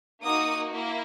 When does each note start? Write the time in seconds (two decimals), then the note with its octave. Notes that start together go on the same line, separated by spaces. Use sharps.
0.23 A#3 D#4 F#4 D#6
0.73 A#3 E4